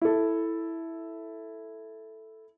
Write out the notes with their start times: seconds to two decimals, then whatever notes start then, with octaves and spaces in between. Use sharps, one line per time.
0.02 E4 A4